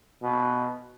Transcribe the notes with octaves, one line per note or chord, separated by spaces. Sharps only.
B2